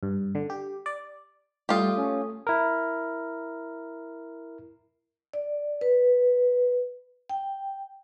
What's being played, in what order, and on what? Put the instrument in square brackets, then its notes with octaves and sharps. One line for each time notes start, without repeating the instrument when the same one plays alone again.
[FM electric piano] G2
D3
G4
D5
[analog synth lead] G3 [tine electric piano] A3 A4 D#6 [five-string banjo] F4 G4
[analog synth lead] C#4
[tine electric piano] E4 A#4
[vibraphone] D5
B4
G5